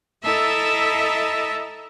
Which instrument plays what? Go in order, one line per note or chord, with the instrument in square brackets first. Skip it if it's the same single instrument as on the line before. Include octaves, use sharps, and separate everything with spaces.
[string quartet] E4 A4 D#5 E5 A5 A#5